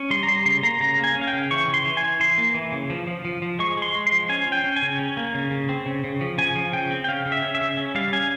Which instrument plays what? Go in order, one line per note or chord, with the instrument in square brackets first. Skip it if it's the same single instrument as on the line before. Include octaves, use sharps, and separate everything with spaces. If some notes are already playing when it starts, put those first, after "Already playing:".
Already playing: [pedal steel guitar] C#4
G3 C6
A#5
G3 C6
C#3 C6
A#3 A#5
C#3 A#5
A#3
G#5
C#4
F5
G5
C#3
E3 C#6
C#3
C6
E3
G#5
E3
E3 C6
A#3
E3
C#3
F3
F3
F3
F3
G#3 C#6
G#3
C6
G#3
C6
F3
C#4 G#5
C#4
G5
C#4
G#5
C#3
C#4
A#3
C#3
C#3
C4
C#3
C#3
F3
C#3 G#5
F3
C#3 G5
C4
G5
C#3 F5
C#3
E5
C#4
E5
C#3
C#4
G3 F5
C#4 G#5